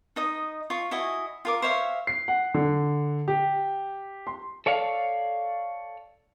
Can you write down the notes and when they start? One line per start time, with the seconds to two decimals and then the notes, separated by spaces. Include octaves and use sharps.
0.16 D#4 D#5 D#6
0.70 F4 C#6
0.91 E4 F#4 D#5 G#5
1.45 F4 A#4 D6
1.62 C5 C#5 E5 F5
2.07 C7
2.28 F#5
2.54 D3
3.28 G4
4.27 C6
4.66 A4 C#5 D5 F5